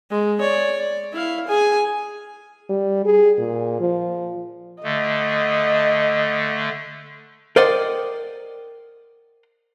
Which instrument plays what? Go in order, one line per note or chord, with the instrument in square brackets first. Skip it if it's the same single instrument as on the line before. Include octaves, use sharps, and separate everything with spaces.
[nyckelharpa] G#3
C#5 D5
D5
E4 F5
G#4 G#5
[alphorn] G3
G#4
A#2
F3
[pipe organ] D3 A3 [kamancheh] D#5
[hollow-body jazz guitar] A#4 C5 D5 D#5 F#5 G5